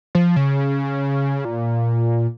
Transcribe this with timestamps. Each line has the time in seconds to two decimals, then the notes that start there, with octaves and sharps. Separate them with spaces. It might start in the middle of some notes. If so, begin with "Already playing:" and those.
0.15 F3
0.36 C#3
1.45 A#2